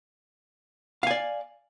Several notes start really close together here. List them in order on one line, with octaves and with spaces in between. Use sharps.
F5 G#5 D5